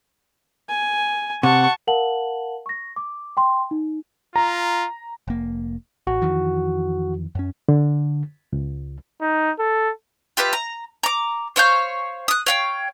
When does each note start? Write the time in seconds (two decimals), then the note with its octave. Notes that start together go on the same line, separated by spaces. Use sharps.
0.70 G#5
1.43 C3 F#5 A5 C#6
1.87 A#4 F5 F#5 A5 F#7
2.66 C#6 A#6
2.96 D6
3.37 G5 C6
3.71 D#4
4.36 F4 A#5
5.28 F1 A#3
6.07 A1 F#4
6.22 F2 D#3 E3
7.35 F#2 C#4
7.69 D3
8.53 C#2
9.21 D#4
9.59 A4
10.37 F4 G4 B4 E5
10.53 A#5
11.03 A#5 D6
11.56 C5 C#5 F5 G6
12.28 D#6 F#6
12.46 C#5 F5 G5